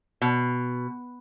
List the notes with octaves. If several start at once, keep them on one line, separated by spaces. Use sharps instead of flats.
B2